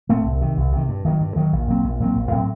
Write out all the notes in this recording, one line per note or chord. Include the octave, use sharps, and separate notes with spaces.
A2 A3 C4
C2
C3 D#3
C2
C3 D#3
G2
D#3 F#3
G2
D#3 F#3
A#1
A#2 F#3 C4
A#1
A#2 F#3 C4
A#1
A2 F#3 C4